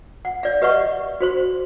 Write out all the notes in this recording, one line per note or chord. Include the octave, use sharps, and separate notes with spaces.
F#5
D5 F5
G4 B4 D#5 E5 F#5 C#6
F#4 C5 C6